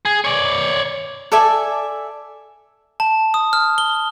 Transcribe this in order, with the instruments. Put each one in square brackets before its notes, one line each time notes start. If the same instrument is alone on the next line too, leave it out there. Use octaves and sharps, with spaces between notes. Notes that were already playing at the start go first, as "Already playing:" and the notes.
[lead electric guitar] G#4
C#5 D5
[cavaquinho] A4 D5 E5 G#5
[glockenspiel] A5
D#6
F6
G7